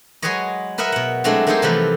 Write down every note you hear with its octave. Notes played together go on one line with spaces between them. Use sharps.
F#3 G#3 G#4 B4 C#5 D#5
A#4 B4 D#5 E5 F#5
B2 F#5
F#3 G#3 A3 C4 D4 E4
A3 A#3 D#4 G#4 A4 C5
C3 E3 F3 G3 A3 B4